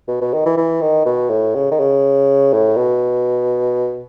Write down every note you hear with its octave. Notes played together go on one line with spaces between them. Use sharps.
B2
B2
D#3
E3
E3
D#3
B2
A2
C#3
D#3
C#3
A2
B2